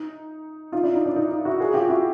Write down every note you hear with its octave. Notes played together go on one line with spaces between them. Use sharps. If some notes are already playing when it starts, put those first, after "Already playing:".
Already playing: D#4
D#4 F4
D4 E4
D#4
D4
D#4
D#4
E4 F#4
F#4 G#4
F4 G4
E4 F#4